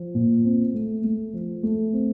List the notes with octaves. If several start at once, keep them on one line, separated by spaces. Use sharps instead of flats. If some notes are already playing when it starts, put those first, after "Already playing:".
Already playing: F3
A#2
C4
A3
A3
F3
A3
C4